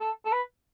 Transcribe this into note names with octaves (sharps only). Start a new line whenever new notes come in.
A4
A4
B4